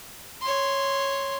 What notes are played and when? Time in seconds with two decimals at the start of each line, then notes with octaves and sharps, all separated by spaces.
0.41 C#5 C6